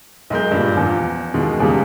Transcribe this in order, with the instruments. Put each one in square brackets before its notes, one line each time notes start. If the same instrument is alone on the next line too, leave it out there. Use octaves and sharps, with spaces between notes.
[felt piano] B1 G#3 A#4 G6
G2 A#2
E2 F3
D#2 B2 E3 G#3
E2 C#3 G3